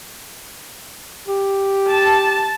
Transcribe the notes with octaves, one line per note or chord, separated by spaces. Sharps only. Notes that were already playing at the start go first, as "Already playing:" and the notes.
G4
A5